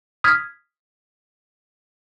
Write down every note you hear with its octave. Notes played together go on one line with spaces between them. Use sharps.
D#6 F6 G#6 B6